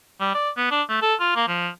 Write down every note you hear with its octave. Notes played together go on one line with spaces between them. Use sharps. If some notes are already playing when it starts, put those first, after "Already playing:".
G3
D5
B3
D4
A3
A4
F4
A#3
F3